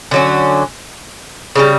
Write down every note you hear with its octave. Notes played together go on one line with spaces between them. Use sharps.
D3 F#3 C#4
C#3 E3 G3